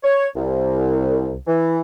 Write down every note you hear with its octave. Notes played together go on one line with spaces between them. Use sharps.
C#5
C2
E3